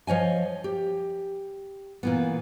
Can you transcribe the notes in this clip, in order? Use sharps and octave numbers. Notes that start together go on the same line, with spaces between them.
F3 C#5 D#5 G#5
G4
A#2 E3 B3